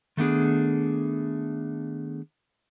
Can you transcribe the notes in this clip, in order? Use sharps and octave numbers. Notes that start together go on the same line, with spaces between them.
D#3 A3 B3 D4 G#4